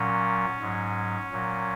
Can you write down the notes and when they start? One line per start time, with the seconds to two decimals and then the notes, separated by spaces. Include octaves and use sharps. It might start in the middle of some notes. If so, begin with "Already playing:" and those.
Already playing: A#2 F#3 C#4
0.60 G#2 F#3
1.31 A#2 F#3